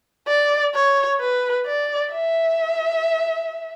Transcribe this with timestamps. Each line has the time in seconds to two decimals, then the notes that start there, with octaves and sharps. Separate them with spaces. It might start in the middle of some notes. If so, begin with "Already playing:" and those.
0.28 D5
0.74 C#5
1.21 B4
1.67 D5
2.12 E5